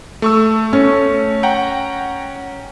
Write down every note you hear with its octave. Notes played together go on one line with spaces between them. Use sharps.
A3 C#6 E6
C#4
F#5 G5 A#5